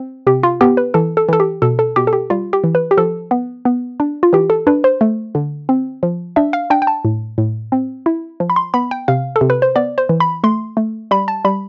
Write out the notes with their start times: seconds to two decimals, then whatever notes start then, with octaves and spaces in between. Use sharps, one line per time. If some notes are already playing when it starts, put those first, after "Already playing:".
Already playing: C4
0.27 C3 G4
0.43 F4
0.61 B3 G4
0.77 B4
0.94 E3 A4
1.17 A4
1.29 E3 A4
1.40 G4
1.62 B2 A4
1.79 A4
1.96 B2 G4
2.07 A4
2.13 G4
2.30 G3 F4
2.53 G4
2.64 E3
2.75 B4
2.91 G4
2.97 F3 A4
3.31 B3
3.65 B3
4.00 D4
4.23 F4
4.33 E3 G4
4.50 A4
4.67 D4 B4
4.84 C5
5.01 A3
5.35 D3
5.69 C4
6.03 F3
6.36 D4 E5
6.53 F5
6.70 D4 G5
6.82 G5
6.87 A5
7.05 A2
7.38 A2
7.72 C4
8.06 E4
8.40 F3
8.50 B5
8.56 C6
8.74 B3 B5
8.91 G5
9.08 C3 F5
9.36 A4
9.41 C3
9.50 B4
9.62 C5
9.76 B3 D5
9.98 C5
10.09 E3
10.20 B5
10.44 A3 C6
10.77 A3
11.11 G3 B5
11.28 A5
11.45 G3 B5